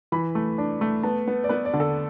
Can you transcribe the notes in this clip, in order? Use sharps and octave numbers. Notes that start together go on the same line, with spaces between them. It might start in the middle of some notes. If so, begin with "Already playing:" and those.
E3 B5
A3
D4
A3
B3 A5
B3
D5
B3 B4
D5
D3
A4